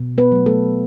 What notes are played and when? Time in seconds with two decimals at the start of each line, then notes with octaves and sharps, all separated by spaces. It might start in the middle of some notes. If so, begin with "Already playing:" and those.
Already playing: B2
0.18 B3 B4
0.32 F#3 A3
0.46 A3 A4